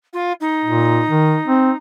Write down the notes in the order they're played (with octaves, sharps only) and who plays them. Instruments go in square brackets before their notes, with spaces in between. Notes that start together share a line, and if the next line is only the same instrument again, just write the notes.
[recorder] F4
D#4
[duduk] A#2
D#3
C4